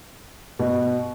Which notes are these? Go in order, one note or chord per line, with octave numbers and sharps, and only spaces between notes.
B2